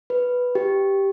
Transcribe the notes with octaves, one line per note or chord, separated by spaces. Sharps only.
B4
G4